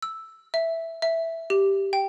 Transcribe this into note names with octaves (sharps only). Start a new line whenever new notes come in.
E6
E5
E5
G4
G5